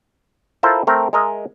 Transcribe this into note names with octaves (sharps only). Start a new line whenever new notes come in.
E4 F4 A4 A#4 C5
A3 C4 A#4
G#3 A#4 D#5 E5